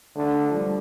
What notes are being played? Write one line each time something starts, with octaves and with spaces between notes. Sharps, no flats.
D3 A3
F3
G3